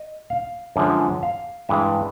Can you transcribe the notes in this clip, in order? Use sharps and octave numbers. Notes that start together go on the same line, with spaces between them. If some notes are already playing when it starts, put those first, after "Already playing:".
Already playing: D#5
F5
F#2 D3 F3 G#3
F5
G2 E3 G#3 E5